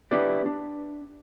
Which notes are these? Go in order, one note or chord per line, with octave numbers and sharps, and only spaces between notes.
B3 D4 E4 G4 B4 D5
D4